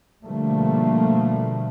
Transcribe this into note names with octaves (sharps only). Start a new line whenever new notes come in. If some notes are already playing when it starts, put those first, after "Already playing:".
B2 D3 F3 G3 A3 A#3